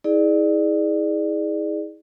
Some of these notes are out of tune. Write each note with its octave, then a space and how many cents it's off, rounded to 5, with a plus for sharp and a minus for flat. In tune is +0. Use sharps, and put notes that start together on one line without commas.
E4 -40 G#4 +0 D5 +20